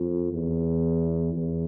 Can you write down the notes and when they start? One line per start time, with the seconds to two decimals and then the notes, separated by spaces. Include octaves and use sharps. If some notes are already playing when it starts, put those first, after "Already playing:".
Already playing: F2
0.32 E2
1.34 E2